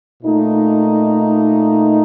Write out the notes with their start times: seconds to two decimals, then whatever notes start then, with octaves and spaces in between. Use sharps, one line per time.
0.23 A#2 A3 D#4